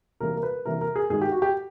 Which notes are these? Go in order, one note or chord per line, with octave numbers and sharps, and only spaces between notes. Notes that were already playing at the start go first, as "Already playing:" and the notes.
C3 E3 G3 A#3 A#4
A#4
B4
C3 E3 G3 A#3 A#4
A#4
G#4
G2 D#3 G#3 G#4
G4
F#4
G4